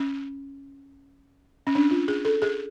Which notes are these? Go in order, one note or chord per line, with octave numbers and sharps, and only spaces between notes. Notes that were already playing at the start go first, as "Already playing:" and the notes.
Already playing: C#4
C#4
D4
F4
G#4
A4
G#4